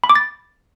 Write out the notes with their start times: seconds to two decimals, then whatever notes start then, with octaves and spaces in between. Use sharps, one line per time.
0.04 B5
0.10 D6
0.15 A6